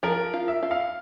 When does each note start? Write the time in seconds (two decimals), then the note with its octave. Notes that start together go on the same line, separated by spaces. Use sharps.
0.03 F3 A#4
0.34 F4
0.48 E5
0.63 F4
0.71 F5